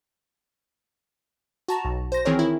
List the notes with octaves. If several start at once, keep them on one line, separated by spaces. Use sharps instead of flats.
F#4 A5 A#5
B1
C5 A#6
D#3 E3 C4 G#4 A#4 C#5
E4